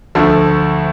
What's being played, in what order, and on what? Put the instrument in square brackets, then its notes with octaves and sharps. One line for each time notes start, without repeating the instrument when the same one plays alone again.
[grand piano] D2 D3 F3 A3